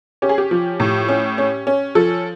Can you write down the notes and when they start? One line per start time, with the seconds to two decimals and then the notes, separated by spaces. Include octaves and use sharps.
0.22 C#4 G4
0.29 G#4
0.38 G4
0.51 F3
0.80 A2
1.09 C#4
1.38 C#4
1.67 C#4
1.95 F3 A4